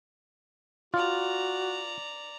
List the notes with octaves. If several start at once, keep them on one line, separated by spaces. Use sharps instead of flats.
F4 F#4 D5 A#5